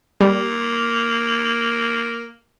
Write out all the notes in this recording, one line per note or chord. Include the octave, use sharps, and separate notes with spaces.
G3 A#3